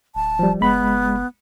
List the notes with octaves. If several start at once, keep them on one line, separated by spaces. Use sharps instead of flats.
D1 A5
F3 G3
F#1 G#3 B3 B5
F#1